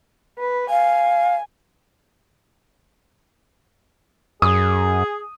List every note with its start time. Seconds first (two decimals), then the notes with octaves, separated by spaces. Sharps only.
0.39 B4
0.70 F5 G#5
4.42 F#2 G#4 D#6